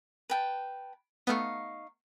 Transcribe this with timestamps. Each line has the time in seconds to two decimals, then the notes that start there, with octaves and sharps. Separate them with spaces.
0.30 B4 G5 A5
1.27 A3 B3 D#4 F5 C#6